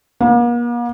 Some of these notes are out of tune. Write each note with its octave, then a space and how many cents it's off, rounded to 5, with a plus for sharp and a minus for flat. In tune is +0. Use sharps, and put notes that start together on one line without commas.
A#3 +45